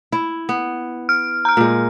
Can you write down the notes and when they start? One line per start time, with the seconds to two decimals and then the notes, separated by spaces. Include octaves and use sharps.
0.12 E4
0.49 B3
1.09 F6
1.45 A#5 F6
1.57 A#2 G#3